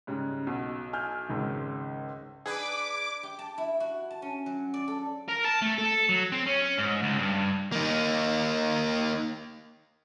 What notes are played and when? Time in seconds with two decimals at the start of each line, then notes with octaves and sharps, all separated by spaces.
0.07 G#2 C#3 G3
0.47 B1 B2
0.93 G#5 F6 G6
1.29 G#1 C#2
2.46 D4 G#4 B4 D6
3.23 G4
3.39 A5
3.58 E4
3.80 F#4
4.11 A5
4.22 C#4
4.46 F#3
4.74 D5
4.88 A4
5.29 A#4
5.45 A5
5.62 A3
5.78 A4
6.09 F#3
6.32 C4
6.46 C#4
6.78 G#2
7.03 C#2
7.19 G2
7.72 A#3 D#4